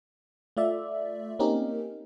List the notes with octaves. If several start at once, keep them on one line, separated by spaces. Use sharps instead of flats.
A3 F4 D5 E5
A#3 C4 C#4 D#4 G4 A#4